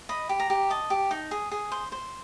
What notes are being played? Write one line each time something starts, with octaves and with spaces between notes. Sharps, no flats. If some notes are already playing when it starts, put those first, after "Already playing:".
D#5 B5
G4
A#5
G4
D#5 A5
G4
D#4
G#4
G#4
C5
C5